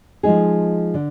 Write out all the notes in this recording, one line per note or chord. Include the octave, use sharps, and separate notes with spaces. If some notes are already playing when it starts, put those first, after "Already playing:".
F3 G#3 D#4 G#4
D3